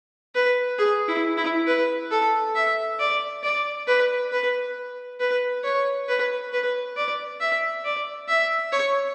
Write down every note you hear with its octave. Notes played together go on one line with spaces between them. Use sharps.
B4
G#4
E4
E4
B4
A4
E5
D5
D5
B4
B4
B4
C#5
B4
B4
D5
E5
D5
E5
C#5